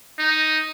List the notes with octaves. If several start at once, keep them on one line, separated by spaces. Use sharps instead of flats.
D#4